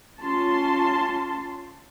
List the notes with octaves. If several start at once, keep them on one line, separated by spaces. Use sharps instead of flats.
C#4 F4 A5 C6